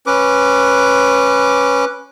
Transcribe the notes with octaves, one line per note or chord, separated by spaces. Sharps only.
C#4 B4 D6